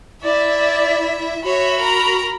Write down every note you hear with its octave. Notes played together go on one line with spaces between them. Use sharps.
E4 D5 E5
F#4 C#5 E5 B5
A#4 A#5